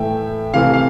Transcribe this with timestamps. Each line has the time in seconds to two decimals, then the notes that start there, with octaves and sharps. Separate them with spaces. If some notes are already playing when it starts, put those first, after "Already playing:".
Already playing: A2 E3 A3 E5 G5
0.54 C3 E3 A3 C4 F5
0.73 F5